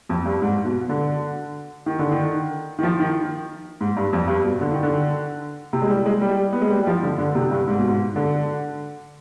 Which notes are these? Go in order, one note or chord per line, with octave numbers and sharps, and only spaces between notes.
F2
G2
G#2
B2
D3
D#3
D3
D#3
D#3
F3
D#3
G#2
G2
F2
G2
B2
D3
D#3
D3
C3
G#3
G3
G#3
G3
B3
G#3
G3
G3
F3
D3
D3
C3
G2
G#2
B2
G#2
D3